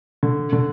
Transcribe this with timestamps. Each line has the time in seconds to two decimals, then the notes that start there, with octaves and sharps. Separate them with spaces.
0.23 D3
0.53 D3